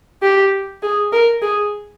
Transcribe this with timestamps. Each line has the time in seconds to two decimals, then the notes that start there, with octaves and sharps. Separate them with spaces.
0.22 G4
0.83 G#4
1.12 A#4
1.42 G#4